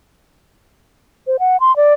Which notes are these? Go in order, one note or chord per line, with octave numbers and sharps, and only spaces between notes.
C5
F#5
C6
D5